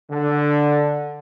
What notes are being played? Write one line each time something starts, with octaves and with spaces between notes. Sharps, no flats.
D3